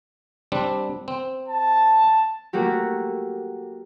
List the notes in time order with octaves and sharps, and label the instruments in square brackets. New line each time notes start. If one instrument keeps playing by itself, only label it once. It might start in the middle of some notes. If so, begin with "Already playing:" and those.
[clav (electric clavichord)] G3 C4 D4
C4
[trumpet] A5
[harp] A3 A#3 F#4 G4